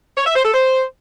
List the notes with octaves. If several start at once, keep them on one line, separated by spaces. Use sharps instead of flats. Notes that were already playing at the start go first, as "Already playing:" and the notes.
C#5
E5
C5
A4
C5